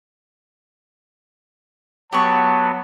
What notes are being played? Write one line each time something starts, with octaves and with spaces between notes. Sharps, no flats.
F#3 B3 G4 F#5 A5 C#6